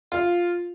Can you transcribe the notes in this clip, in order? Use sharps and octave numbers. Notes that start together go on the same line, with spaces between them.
F4